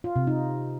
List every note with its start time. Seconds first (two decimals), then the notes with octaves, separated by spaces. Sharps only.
0.04 F4
0.16 C3
0.27 D#4